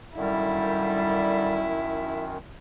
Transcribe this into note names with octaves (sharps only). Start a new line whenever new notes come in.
F#2 A#2 D3 D#3 G3 E4